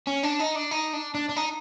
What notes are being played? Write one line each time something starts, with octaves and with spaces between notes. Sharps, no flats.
C#4
D4
D#4
D4
D#4
D4
D4
D4
D#4